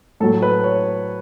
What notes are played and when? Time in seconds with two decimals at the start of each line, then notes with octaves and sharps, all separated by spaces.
0.20 A2 F#3 A3 A4
0.42 B4
0.64 C#5